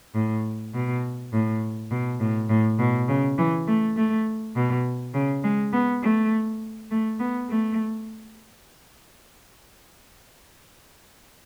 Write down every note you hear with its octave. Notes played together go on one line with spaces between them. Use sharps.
A2
B2
A2
B2
A2
A2
B2
C#3
E3
A3
A3
B2
C#3
G#3
B3
A3
A3
B3
A3